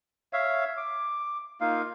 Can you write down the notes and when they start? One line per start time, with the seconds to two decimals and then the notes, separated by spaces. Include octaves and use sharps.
0.33 C#5 E5 F5
0.77 D6
1.61 A#3 D#4 F4 F5